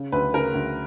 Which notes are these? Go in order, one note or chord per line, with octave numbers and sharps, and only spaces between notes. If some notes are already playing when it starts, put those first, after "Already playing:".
Already playing: C#3
D2 B4
C#3 A#4
D2